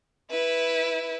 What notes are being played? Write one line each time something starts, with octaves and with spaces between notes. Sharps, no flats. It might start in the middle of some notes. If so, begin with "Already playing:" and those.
E4 B4